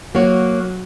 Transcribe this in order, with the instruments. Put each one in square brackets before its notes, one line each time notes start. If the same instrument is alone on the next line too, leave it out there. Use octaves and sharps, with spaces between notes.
[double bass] F#3 [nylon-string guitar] A#3 F#4 C#5